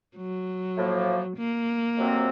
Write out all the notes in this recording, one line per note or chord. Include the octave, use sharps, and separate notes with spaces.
F#3
A2 F3 A#3
A#3
F2 C3 F#3 C4